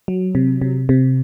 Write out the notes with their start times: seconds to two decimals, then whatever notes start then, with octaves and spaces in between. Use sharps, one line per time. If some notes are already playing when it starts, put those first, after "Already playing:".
0.08 F#3
0.35 C3
0.62 C3
0.89 C3